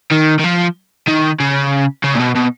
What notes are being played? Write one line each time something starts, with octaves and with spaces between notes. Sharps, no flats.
D#3
D#3
F3
D#3
C#3
C#3
A#2
B2
B2